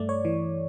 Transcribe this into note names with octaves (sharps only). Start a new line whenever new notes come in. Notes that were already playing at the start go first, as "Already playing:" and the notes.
Already playing: G2 A3 D5
C#5
E3